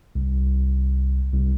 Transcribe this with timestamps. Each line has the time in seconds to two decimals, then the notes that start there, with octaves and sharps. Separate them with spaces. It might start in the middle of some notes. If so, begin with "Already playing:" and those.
0.15 C2
1.33 C2